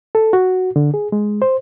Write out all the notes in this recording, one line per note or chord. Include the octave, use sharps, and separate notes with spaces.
A4
F#4
D3
G#4
G#3
C5